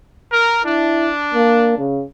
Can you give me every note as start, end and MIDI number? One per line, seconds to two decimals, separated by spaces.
0.33 0.62 70
0.64 1.85 62
0.64 1.10 64
1.34 1.75 58
1.78 2.02 49